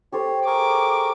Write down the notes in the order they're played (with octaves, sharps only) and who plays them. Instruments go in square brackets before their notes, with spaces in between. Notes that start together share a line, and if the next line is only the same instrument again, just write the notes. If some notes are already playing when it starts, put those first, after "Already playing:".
[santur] G4 A4 C5 [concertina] C#5
[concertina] G#4 A#4 C#6 [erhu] D6